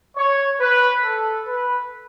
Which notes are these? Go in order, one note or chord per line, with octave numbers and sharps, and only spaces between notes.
C#5
B4
A4
B4